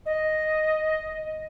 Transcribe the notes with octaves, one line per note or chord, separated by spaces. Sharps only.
D#5